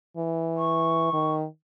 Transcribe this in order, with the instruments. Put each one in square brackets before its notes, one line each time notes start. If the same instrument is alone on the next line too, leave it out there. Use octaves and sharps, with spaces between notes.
[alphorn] E3
[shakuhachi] C#6
[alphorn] D#3